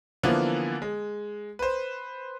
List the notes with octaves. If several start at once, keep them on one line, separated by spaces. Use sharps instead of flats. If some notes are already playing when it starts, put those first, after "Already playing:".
D3 E3 F3 A#3 B3
G#3
B4 C5